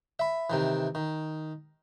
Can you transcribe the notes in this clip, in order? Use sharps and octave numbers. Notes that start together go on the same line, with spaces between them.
E5 B5
C3 D#3 E3
D#3